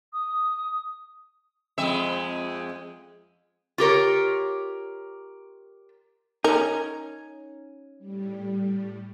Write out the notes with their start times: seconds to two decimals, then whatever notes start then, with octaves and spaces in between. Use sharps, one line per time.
0.13 D#6
1.78 F2 G#3 E5
3.78 F4 G4 A#4 C#5
6.44 C#4 D#4 A#4
7.99 A2 G3